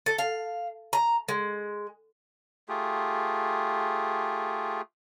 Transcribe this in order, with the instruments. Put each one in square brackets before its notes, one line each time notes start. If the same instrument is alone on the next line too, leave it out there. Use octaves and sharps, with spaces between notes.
[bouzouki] A4
F5
A#5
G#3
[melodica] A3 F4 G4 G#4